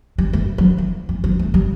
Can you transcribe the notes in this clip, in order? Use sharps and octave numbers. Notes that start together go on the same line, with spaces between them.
G3
A3
F#3
E3
E3
F#3
A3
G3